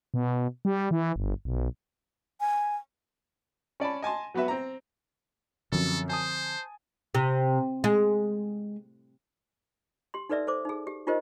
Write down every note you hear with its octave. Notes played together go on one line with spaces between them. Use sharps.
B2
G3
E3
G1
B1
G#5
C#4 D5 A5 B5
D#5 G#5 A5 C6
F#3 B3 F#4 B4 E5
C4 A#5
F#2 D3 F3 C4 A4
C5 G#5 A5 D#6
C3
G#3
G4 C6
D#4 A4 B4 D5 E5 E6
A4 C5 D6
D#4 G#4
G4
D#4 F4 G4 A#4 C5 D#5